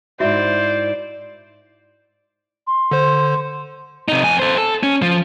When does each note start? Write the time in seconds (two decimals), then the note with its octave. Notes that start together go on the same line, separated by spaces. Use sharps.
0.20 G#2 E4 F#4 C5 D5 E5
2.67 C6
2.91 D3 C5
4.08 C3 D#4
4.24 F2 G#5
4.39 A4 C5
4.58 A4
4.83 C#4
5.02 F3